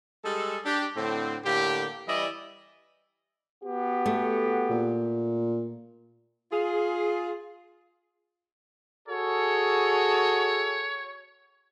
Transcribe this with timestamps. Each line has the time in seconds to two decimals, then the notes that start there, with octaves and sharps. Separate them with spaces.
0.25 G3 G#3 G#4 A4
0.65 D4 G4
0.97 A2 D3 C4
1.45 A2 D3 A#3 G4
2.08 E3 G3 E4 D5 D#5
3.64 B3 F#4 G4
4.06 A3
4.70 A#2
6.51 F4 G#4
9.08 F#4 G#4 A4 C#5